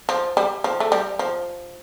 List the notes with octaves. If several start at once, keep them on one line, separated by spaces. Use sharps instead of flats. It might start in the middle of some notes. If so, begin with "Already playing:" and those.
F3
G3
F3
A3
G3
F3